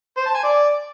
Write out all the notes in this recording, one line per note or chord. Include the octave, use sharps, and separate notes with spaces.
C5
A5
G#5
D5